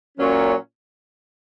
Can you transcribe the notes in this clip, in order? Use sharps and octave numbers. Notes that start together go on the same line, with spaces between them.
A#2 F#3 C#4